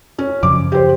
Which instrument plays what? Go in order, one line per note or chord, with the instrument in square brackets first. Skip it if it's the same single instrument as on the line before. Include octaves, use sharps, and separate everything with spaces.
[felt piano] C#4
[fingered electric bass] F#2 C#3 F3 [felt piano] D6
[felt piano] G4 C5